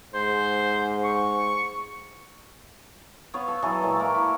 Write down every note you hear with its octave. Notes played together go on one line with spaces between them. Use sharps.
G#2 C5
C#6
B3 C#5 F5
A4 E5
E3 F#3 G#4 A4
A#2 G#3 E4 C#5
A3 A#3
E4 F#4